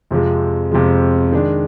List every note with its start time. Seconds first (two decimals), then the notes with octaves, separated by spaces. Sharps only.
0.11 F2 C3 F3 G#3
0.72 F2 C3 F3 G#3
1.32 D#3 G#3 D4